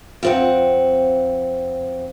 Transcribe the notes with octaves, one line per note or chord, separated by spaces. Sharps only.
F2 C4 F#5